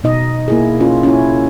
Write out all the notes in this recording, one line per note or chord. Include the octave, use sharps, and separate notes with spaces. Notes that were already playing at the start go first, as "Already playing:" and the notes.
B2 D#4 D#5
A#3 E4 G#4
C#4 F4
C#4 E4